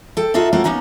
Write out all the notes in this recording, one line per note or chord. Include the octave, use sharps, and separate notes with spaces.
A4 G5
D#4 F4 F#4 A4 E5
A3 A#3 C#4 F4 F#4
A#3 B3 C#4 D#4 A#5